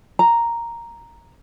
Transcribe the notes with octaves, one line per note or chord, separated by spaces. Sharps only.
A#5